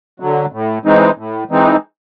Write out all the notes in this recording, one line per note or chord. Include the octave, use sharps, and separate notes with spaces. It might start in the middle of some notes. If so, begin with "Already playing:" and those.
D3 F#3
A2
E3 G#3 C4 D#4
A2
E3 G#3 C4 D#4